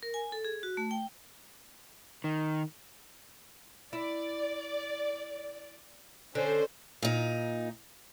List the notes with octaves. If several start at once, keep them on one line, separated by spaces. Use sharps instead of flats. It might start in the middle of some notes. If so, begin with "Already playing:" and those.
A#4
G#5
A4
G#4
F#4
A3
G5
D#3
E4 D5
D3 C#4 C5
A#2 D#4